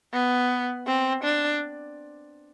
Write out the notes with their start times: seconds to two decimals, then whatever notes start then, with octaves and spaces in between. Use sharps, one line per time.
0.13 B3
0.87 C4
1.24 D4